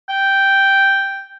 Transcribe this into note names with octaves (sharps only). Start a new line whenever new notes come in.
G5